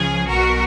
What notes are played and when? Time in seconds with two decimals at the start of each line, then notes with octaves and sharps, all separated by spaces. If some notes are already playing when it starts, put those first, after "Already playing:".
Already playing: C#2 C#3 F3 G#4
0.28 B1 B2 F#4 A#4